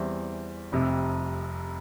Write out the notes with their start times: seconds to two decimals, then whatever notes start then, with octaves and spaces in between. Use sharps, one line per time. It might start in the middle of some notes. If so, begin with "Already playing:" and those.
Already playing: E2 E3 G3 C4
0.72 F1 F2 C3